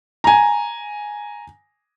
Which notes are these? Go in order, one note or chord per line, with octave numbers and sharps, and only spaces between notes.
G#5 A#5